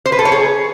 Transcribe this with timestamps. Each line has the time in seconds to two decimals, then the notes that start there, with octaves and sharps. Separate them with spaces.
0.06 C5
0.12 B4
0.19 A4
0.25 C#5
0.32 G#4